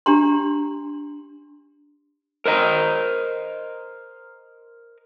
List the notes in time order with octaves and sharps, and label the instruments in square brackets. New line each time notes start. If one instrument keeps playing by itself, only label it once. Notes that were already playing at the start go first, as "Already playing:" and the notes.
[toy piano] D4 G4 A#5 C6
[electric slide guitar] A#4 C5 D#5 A#5